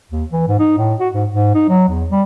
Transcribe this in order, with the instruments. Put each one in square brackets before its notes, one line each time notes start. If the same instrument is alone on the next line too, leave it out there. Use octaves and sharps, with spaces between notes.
[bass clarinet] D#2
E3
G#2
D#4
A2
F#4
G#2
G#2
D#4
F#3
E2
G3